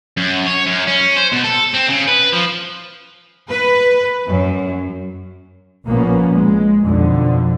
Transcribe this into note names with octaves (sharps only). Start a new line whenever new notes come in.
F#2
C#5
F#2
C#4
C5
B2
A4
C4
C#3
B4
F3
B4
F#2
A#1 A#2 F3 A#3 B3 C#4
G#3
B1 F2 D3